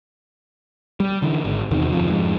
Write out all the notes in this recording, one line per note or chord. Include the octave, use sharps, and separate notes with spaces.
G3
D3 E3
G#1
E2 C3 D#3
G1 F2 F3
F2 G#2